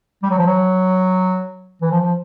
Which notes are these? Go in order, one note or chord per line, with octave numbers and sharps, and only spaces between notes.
G3
F#3
F3
F#3
E3
F3
F3